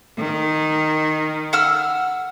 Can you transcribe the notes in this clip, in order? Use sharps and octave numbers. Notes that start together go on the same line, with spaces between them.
D#3
F#5 E6 F6